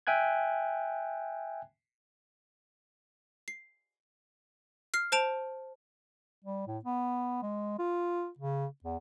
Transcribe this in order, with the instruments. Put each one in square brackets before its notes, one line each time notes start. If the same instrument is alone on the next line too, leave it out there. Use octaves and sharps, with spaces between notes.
[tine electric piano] E5 G5 G#5 F#6 G#6
[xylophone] C7
F6 C7
C5 A5 D7 F7
[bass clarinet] G3
A2
B3
G#3
F4
C#3
E2